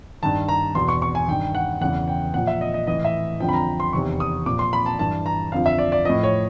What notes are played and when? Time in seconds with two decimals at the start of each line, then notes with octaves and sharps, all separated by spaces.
0.23 G2 D#3 A5
0.49 A#5
0.75 E2 B2 C6
0.88 C#6
1.02 C#6
1.15 G#5
1.28 G2 D#3 G5
1.55 F#5
1.81 E2 C#3 E3 F#5
2.08 G5
2.34 A#2 F3 F#5
2.47 E5
2.61 D#5
2.74 D#5
2.87 A2 E3 D#5
3.05 E5
3.40 F2 D3 F3 G5
3.49 B5
3.53 A#5
3.80 C6
3.93 E2 C3 D#3 C#6
4.20 D#6
4.46 A#2 F3 D6
4.59 C6
4.73 B5
4.86 A5
4.99 G2 E3 A5
5.26 A#5
5.52 F2 D3 F3 F5
5.66 E5
5.78 D5
5.92 D5
6.05 A2 F3 D#5
6.23 C#5